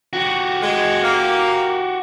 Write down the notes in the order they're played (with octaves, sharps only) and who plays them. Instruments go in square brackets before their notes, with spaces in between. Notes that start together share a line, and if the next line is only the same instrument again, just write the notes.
[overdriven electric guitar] F#4 G4
[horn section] G#3
A#3